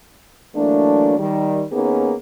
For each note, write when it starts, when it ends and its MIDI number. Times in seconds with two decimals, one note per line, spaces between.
0.55 1.17 52
0.55 1.17 54
0.55 1.17 57
0.55 1.17 58
0.55 1.17 62
1.18 1.64 51
1.18 1.64 55
1.71 2.13 39
1.71 2.13 58
1.71 2.13 59
1.71 2.13 61
1.71 2.13 63
1.71 2.13 68